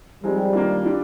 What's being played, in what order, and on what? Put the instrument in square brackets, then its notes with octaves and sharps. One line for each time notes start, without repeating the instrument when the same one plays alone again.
[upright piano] F3 G#3 C4 D#4 [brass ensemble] G3
[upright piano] D#3 A#3 D4 F4
G3 D4 F4